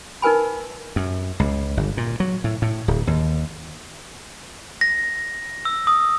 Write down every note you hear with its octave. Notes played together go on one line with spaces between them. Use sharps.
D#4 A#4 B4 G#5 B5
F#2
C#2
G1
A#2
F#3
A2
A2
D1
D#2
A#6
E6
D#6